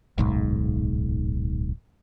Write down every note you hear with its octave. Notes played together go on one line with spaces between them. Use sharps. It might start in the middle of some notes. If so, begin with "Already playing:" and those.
D1 B1 G#2